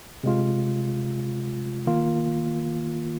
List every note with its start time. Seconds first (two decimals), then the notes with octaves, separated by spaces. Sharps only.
0.23 C3 G#3 F4
1.87 D#3 A#3 F4